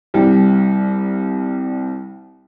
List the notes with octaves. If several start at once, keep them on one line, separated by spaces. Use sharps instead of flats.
C2 G3